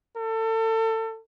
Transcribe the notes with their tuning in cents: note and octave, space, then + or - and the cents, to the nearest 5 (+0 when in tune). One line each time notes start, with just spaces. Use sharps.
A4 +30